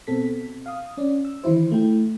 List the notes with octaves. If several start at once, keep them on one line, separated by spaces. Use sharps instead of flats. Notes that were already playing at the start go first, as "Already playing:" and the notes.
B2 C4 A4 B6
F5 D#6
C#4 D5
E6
D#3 E3 D#4 E4 C5
A3 E4 G5